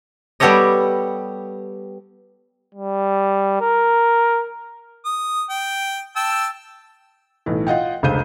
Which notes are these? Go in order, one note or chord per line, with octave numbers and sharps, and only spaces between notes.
G3 B3 G4 A4 C#5 D#5
G3
A#4
D#6
G5
G5 A5 E6
B1 A2 E3
F4 D#5 F#5 G5
F1 C#2 D3 C5 G6 D#7